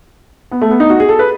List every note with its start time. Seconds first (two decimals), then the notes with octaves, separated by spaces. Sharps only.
0.52 B3
0.61 A3
0.71 B3
0.80 D#4
0.90 F#4
1.00 G#4
1.09 A4
1.19 B4